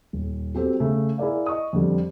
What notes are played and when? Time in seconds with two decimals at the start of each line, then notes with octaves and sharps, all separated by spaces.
0.13 D#1
0.55 F#3 C4 G4 A4
0.80 C#3 A3
1.18 E4 G#4 A#4 D5 F5
1.46 D#5 C#6 D#6
1.73 F2 D3 G3